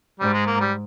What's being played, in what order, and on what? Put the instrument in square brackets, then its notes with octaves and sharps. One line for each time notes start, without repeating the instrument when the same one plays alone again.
[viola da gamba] G#2 [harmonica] G3
[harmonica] G#3
A#3
G3